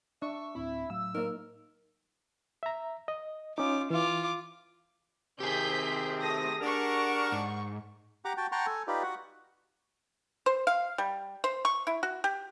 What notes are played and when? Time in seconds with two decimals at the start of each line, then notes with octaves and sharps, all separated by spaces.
0.22 D4 E5 C#6
0.55 D2 A2 C4 E4
0.90 A2 F#3 F5 E6
1.15 A#3 D#4 A#4
2.63 E5 A#5
3.08 D#5
3.58 C#4 D#4 F4 D6
3.90 E3 F4 D6
5.40 C3 D#3 C4 G4 G#4 G6 B6
6.19 A3 D#6 A#6
6.61 D4 A#4 F#5 C#6
7.32 G#2
8.25 G4 F#5 A#5 D6
8.37 F#4 G5 A5
8.52 F#5 G5 A5 A#5 C6 C#6
8.66 A4 G#5
8.88 D#4 F4 G4 B4 D5
9.03 F#4 F#5
10.46 C5
10.67 F5
10.98 G3
11.44 C5
11.65 C#6
11.87 E4
12.03 F#4
12.24 G4